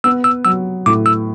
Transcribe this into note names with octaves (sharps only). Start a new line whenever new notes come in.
B3 E6
E6
F#3 E6
A2 D6
E6